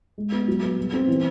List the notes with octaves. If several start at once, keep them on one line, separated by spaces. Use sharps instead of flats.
G#3
B3
F#3
B3
G3
C4
E3